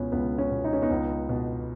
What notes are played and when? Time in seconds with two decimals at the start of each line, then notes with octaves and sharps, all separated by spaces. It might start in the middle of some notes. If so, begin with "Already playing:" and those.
Already playing: C#2 B2 B3 C#4
0.12 C#2 B3
0.38 C#4
0.51 B2
0.64 D#4
0.73 C#4
0.82 B3 D#4
0.90 C#2
1.29 B2